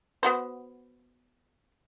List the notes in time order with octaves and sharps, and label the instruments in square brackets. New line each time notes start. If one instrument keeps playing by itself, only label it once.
[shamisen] B3 F#4 C5